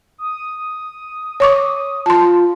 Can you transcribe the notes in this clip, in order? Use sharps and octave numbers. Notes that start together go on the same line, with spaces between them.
D#6
C#5 C#6 D6
F4 A5 C6